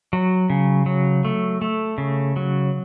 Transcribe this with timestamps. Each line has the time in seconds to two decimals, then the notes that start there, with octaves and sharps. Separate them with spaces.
0.13 F#3
0.50 C#3
0.86 F#3
1.25 A3
1.62 A3
1.98 C#3
2.36 F#3